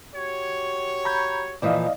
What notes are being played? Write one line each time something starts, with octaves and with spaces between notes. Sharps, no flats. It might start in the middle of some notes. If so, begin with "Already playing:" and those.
F#4 G4 C#5
A#5 B5 G6
A#2 E3 F3 D5 D#5 F5